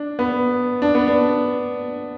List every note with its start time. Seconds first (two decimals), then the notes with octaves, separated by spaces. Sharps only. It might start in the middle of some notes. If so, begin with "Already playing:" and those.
Already playing: D4
0.19 B3
0.82 D4
0.95 B3
1.08 D4